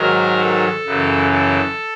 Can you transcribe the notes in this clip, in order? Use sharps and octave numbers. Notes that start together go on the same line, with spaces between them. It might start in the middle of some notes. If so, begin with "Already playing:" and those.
Already playing: G#2 D#3 F#3 A#4
A4
F#2 C#3 E3
A4